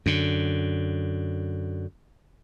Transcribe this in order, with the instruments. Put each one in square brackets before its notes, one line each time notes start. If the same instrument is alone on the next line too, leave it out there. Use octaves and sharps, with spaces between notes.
[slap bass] F#2 D3